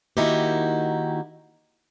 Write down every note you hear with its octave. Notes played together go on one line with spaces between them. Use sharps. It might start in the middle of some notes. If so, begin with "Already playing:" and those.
D#3 A#3 D#4 E4 F#4 G4